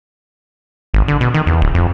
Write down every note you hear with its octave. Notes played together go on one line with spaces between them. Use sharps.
G#1
D3
B2
D#3
E2
D1
F2